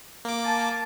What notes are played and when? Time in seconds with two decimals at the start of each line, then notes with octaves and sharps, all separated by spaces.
0.25 A#3 D6
0.45 G#5 A5